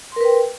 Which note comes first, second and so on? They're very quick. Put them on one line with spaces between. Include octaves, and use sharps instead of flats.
C6 A#4 B4 G5